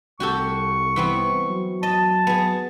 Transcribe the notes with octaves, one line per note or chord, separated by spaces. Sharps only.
C2 F#4 G4 A4 C#6
E3 B3 C4
F#3
D#5 A5
B3 G#4